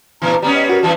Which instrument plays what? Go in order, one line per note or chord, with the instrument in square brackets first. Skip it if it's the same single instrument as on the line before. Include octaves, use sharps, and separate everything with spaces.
[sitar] G2 A#2 E3 [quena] A#5
[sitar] G3 B3 C#4 [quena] A#5
[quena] D#5
[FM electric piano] F#4 [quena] A#4
[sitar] G2 E3 G3 [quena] A5